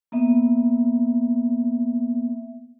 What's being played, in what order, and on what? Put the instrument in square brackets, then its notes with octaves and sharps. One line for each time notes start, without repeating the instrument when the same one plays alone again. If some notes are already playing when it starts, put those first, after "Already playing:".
[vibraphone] A#3 B3 E5